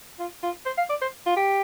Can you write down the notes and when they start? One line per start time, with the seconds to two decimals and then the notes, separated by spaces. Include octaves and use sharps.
0.19 F4
0.43 F4
0.66 C5
0.78 F5
0.90 D5
1.02 C5
1.26 F4
1.36 G4